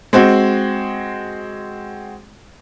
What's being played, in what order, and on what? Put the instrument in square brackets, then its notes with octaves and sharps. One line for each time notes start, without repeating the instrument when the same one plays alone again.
[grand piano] G#3 C4 F#4